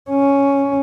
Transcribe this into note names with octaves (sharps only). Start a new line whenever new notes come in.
C#4